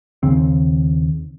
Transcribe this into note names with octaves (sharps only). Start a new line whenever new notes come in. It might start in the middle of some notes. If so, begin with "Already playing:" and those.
D#2 C#3 C4